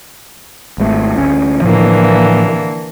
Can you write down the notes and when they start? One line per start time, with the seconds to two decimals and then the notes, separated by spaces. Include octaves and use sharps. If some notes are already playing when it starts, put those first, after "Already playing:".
0.78 G#1 G#2 A3
1.16 D2 C#4
1.62 A2 D3 E3 F3 A#3